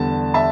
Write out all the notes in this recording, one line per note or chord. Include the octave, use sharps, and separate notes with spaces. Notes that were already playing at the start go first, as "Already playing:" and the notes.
Already playing: E2 D3 G3 A5
E5 A5